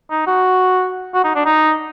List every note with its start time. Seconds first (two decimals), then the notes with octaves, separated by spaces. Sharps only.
0.11 D#4
0.27 F#4
1.14 F#4
1.24 D#4
1.36 D4
1.46 D#4